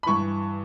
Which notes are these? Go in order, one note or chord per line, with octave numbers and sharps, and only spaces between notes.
B5
G2 E3 C#6